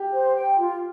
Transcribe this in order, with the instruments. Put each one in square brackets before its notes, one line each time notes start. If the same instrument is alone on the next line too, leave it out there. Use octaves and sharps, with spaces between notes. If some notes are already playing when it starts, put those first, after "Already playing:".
Already playing: [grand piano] G4
[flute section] C5
G5
F4